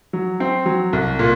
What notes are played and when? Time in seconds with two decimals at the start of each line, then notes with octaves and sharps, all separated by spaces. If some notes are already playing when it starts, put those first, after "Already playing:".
0.13 F#3
0.40 C4
0.66 F#3
0.93 C2
1.19 A#2